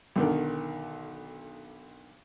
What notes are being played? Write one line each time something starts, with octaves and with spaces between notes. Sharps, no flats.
B1 D3 D#3